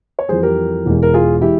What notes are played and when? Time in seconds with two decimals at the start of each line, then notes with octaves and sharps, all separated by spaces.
0.19 C#5
0.29 F2 E3 G3 G#4 C5
0.43 G4 A#4
0.86 E1 E2 E3 G#3
1.03 A#4
1.14 F4 G#4
1.41 E3 G#3 E4 G4